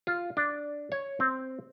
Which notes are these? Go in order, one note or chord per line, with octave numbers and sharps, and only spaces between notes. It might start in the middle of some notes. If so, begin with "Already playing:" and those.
F4
D4
C#5
C4